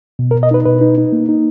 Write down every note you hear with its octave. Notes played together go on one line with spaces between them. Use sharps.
B2
A#4
B2
D#5
D#4 B4
B2 B4
D#4
D#4
A#3
D#4